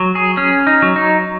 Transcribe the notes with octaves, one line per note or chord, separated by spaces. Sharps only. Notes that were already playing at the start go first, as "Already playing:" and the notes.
Already playing: F#3
G#4
C#4 G#4
D#4
F#3
D#4